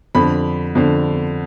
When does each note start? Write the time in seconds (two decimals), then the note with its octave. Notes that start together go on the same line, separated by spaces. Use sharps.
0.15 F2 D3 B5
0.75 F2 D3